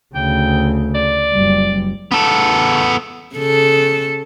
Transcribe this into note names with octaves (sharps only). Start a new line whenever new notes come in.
D2 C#3 G5
D5
F#1 G3
B3 A4
C#3 A4